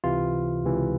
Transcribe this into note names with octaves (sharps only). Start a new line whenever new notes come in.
C#2 C3 E3 F4
C#2 C3 E3